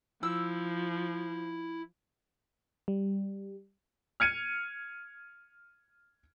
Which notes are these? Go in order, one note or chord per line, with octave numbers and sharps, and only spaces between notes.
F3 E4 E6
G3
F6 G#6 C#7 D#7